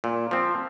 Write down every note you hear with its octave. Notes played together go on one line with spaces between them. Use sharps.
A#2
F3 C4